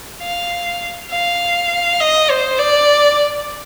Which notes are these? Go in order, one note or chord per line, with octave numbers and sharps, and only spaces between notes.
F5
F5
D#5
C5
D5